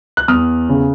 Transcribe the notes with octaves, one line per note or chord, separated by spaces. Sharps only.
F#6
E2 D#6 F6
C#3